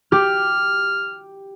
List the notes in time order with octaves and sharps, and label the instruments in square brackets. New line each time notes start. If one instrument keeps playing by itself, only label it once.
[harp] G4 [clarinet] F6